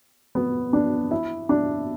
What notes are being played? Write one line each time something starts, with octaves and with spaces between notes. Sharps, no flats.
B3
D4
E4
D4